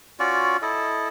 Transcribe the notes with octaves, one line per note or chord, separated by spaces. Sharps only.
C#4 F4 F#4 D5
E4 A4 D#5